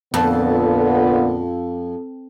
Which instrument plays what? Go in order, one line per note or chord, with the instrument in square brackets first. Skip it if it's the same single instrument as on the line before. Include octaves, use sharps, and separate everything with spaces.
[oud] F2 [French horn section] A#2 D3 B3